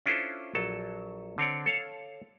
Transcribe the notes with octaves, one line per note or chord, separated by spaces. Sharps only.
C#4 D4 E4 F4 A4 C5
A#1 F#3 A4 A5
D3 C4 C#5 D5
A4 C#5 F5 A5